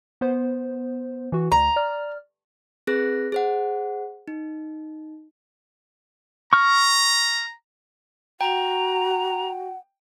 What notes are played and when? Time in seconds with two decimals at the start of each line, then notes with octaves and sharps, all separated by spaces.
0.21 B3 C5
1.32 E3 F#4
1.52 D2 A#5
1.76 D5 F6
2.87 C4 G#4 B4 F#6 A#6
3.32 G#4 C5 F#5
4.28 D#4
6.53 A#5 C#6 F6
8.41 F#4 F#5 G5 A#5